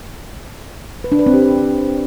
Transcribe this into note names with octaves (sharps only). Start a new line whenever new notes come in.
B4
D4
B4
C4
G4